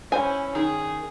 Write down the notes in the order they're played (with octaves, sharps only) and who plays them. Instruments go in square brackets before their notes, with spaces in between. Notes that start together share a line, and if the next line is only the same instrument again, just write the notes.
[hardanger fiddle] C#4 E4 [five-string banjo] C5 G#5
[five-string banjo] D#3 [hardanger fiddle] G#4